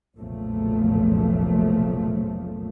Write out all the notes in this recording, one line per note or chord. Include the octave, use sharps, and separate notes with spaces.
F1 B1 A#2 C#3 F3 A3